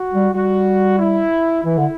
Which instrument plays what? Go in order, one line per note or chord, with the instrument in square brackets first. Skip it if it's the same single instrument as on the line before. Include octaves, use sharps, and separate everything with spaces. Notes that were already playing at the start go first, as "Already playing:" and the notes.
Already playing: [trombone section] F#4
[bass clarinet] G3
[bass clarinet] G3 [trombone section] F#4
[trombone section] E4
[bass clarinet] E3 [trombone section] E4
[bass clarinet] D3